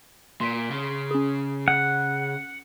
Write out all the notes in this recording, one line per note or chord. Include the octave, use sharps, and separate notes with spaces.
A#2 C6 B6 D7
C#3
C#4 G#4
F#5